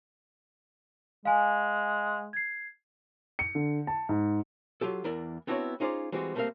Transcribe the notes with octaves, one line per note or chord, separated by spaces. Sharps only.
G#3 F5 G#5
G#6 C7
C#7
D3
A5
G#2
F#3 F4 G4 A4
E2 E4 A#4 D5
B3 C4 D4 E4 F#4 C#5
C#4 D#4 F4 G#4 C5 D5
E3 G3 G#3 C4 F#4 G4
G3 A3 A#3 C4 A#4 F5